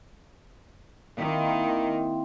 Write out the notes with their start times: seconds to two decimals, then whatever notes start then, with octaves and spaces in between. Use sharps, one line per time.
1.17 D#3 A#3 C4 E4